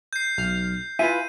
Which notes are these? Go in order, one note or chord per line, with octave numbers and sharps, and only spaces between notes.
G6 C7
B1 F6
E4 F4 B4 E5 F5 G#5 D#7